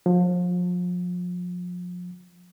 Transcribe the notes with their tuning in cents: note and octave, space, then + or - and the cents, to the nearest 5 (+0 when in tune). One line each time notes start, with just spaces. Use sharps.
F3 +35